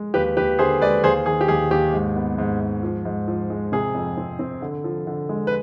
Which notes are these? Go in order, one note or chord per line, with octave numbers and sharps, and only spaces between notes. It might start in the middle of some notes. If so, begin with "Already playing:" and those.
Already playing: G#3
D#2 G4 B4
D#2 G4 B4
D3 G#4 C5
G#3 B4 D5
D#2 G#4 C5
D#3 G#4
G4
D#2 G#4
D#2 G4
G#2
B3
G#2
G#2
F3
G#2
F3
G#3
C3 G#4
F2
C4
C4
D3
F3
D3
G#3
B4